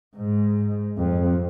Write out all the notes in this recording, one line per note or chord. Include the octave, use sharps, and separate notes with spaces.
G#2
F2